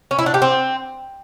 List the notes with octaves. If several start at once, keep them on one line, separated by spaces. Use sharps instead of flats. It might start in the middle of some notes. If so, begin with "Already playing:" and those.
C#4
E4
D4
G4
C4